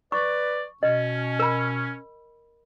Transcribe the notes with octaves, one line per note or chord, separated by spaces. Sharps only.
B4 D5 C#6
B2 C#4 D#5
A#4 B5